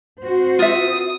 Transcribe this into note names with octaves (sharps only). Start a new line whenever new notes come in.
C4 F#4 C5
F4 E5 D#6